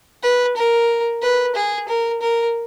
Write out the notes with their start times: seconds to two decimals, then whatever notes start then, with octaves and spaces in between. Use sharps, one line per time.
0.23 B4
0.56 A#4
1.22 B4
1.55 G#4
1.88 A#4
2.21 A#4